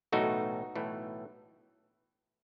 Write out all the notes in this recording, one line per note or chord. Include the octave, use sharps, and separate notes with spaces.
B1 A2 E3 A3 D#4 F#4
B1 A2 E3 A3